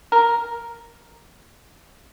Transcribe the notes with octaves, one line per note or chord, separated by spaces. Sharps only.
A#4